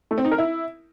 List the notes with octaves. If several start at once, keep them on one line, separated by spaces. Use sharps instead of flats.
A3
C4
D#4
A#4
E4